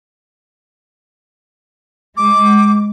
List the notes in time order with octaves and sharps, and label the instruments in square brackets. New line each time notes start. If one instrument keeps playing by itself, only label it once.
[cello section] G#3 [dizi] D6